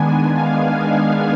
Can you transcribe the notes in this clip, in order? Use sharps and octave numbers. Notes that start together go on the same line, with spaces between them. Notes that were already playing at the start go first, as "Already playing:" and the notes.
Already playing: D#3 G#3 B3 D4 G#5
F5